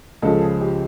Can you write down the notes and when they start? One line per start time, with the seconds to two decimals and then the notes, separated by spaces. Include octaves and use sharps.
0.22 C#2 C#3 F3 A4
0.41 G#4
0.61 G4